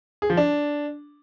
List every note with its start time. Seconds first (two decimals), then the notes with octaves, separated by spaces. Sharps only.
0.22 G#4
0.30 F3
0.37 D4